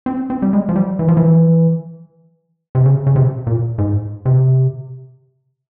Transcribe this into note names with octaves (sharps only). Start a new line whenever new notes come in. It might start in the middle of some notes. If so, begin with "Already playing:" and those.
C4
C4
G3
G#3
F3
G3
E3
F3
E3
C3
C#3
C#3
C3
A#2
G#2
C3